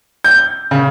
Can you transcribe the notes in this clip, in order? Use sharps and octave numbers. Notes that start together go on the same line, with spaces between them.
G6
C#3